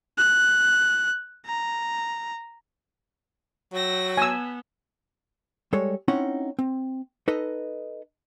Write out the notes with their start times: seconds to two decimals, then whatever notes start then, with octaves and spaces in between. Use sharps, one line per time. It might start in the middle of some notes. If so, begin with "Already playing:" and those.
0.18 F#6
1.46 A#5
3.73 F#3 G5 E6 A#6
4.17 B3 G#5 E6
5.73 G3 G#3 A4 C#5
6.08 C4 C#4 D#4 E4 F#5
6.59 C4
7.28 D#4 A4 B4 D#5